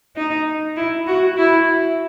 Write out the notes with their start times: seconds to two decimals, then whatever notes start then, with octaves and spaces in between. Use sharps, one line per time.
0.16 D#4
0.76 E4
1.07 F#4
1.37 E4